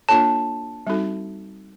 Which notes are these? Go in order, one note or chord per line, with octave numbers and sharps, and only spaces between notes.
A#3 D4 F4 A4 C#5 A5
G3 C4 D#4 F#4 A4